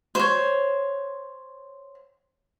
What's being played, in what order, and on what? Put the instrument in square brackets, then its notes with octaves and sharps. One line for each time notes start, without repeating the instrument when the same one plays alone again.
[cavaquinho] C5 C#5